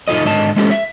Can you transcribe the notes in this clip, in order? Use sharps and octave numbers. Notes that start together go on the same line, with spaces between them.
F#2 D#4 F4 A4 D#5
G#2 D3 D#5 A5
G#3 A3 C#4 F4 G4 A4
E5